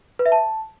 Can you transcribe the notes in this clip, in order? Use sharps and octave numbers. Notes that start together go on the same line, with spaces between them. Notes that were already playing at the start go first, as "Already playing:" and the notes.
B4
E5
A5